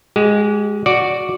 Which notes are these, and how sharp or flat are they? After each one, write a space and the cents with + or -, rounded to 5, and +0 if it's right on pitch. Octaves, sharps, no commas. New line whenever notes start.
G#3 +0 G4 -35
F#4 +0 D5 +0